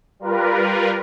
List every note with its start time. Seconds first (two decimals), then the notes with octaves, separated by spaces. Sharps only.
0.19 G3 F4 A#4 B4